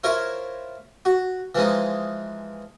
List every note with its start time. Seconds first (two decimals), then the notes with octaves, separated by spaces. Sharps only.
0.04 E4 F4 A#4 C5 C#5
1.05 F#4
1.55 E3 F3 G#3 D#4